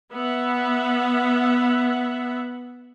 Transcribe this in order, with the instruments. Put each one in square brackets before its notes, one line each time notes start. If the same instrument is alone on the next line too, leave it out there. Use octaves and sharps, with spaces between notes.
[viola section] B3 E5 F#5